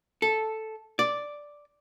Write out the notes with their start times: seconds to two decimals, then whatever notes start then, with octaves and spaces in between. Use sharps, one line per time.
0.22 A4
0.99 D5